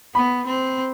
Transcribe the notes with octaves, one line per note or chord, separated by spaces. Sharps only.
B3 B5
C4